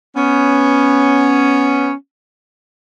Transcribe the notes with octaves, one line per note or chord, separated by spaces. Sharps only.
B3 C#4